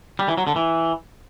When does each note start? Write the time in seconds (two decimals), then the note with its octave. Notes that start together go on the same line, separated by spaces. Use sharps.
0.19 G3
0.28 E3
0.37 F#3
0.47 D3
0.56 E3